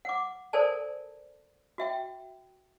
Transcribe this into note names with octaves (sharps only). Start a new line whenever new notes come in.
F#5 D6
A4 A#4 C5 D5 G#5 A5
F#4 E5 G5